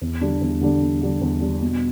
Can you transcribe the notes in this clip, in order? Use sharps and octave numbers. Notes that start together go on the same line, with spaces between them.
E2
D3 G3 D4
E2
D3 G3 D4
E2
D3 G3 D4
E2
D3 G3 D4
B2